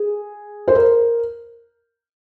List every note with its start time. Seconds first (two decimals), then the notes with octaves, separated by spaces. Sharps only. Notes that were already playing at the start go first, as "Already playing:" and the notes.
Already playing: G#4
0.68 C5
0.75 A#4